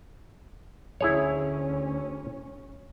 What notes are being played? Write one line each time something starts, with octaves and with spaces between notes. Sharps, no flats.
D2 C#4 E4 G#4 C#5